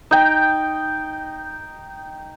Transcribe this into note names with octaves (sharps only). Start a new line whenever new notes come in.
D#4 G5